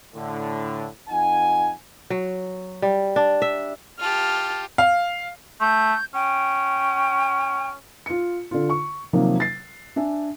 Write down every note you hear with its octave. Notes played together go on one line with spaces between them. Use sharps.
A2 D3
F2 D#4 F#5 G#5
F#3
G3
D4
E5
F4 G4 A5 F6
F5
A3 G6
C#4 G5
F4 C#7
D3 F4
C#6
C3 D#3 F3 F#3 A#3
A6 C7
D4 E5 G#5